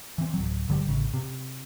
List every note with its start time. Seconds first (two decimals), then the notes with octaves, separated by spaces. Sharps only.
0.18 E3 C4
0.34 D1 F#3
0.69 G1 D3 F#3 G3
0.87 A1 C#3
1.14 C3